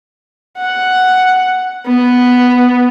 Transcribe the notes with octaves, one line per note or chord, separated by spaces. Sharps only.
F#5
B3